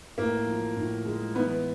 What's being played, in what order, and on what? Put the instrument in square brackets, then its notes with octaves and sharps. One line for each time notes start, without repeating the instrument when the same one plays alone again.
[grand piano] A2 [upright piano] A#3
[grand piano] F3
A2
G#3
[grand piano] E3 [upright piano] B3